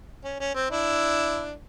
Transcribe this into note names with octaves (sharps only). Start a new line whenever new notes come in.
C#4
C#4
C4
D4 E4